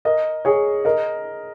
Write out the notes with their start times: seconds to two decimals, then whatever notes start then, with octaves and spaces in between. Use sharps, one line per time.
0.05 A#4 D#5
0.45 G#4 C#5
0.85 A#4 D#5